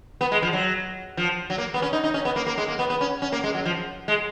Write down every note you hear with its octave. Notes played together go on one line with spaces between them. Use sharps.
B3
G#3
F3
F#3
F3
F#3
A#3
B3
C#4
D#4
D#4
C#4
B3
A#3
A#3
G#3
A#3
B3
B3
C#4
C#4
A#3
G#3
F#3
F3
G#3